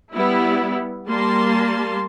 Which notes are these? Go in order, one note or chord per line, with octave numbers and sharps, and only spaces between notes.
G3 B3 E4
G3 A#3 A5 C6